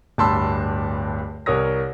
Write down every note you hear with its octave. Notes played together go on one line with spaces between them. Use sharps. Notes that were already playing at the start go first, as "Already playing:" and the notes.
D1 G2 A5 B5 C6 E6
C2 A#4 C#5 D#6 A#6